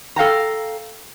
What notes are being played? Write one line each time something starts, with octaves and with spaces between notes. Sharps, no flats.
A4 F5 G5 A#5